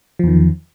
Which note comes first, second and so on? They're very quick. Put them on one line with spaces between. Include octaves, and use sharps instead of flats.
F3 E2 D#3